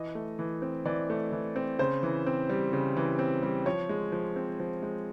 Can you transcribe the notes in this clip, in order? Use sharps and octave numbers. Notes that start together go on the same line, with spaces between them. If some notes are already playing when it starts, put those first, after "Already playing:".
Already playing: E3 D#5
A3
E3
C4
E3 D5
A3
E3
C4
C#3 C5
E3
C4
G3
C#3
E3
C4
G3
F3 C#5
G#3
F3
C4
F3
G#3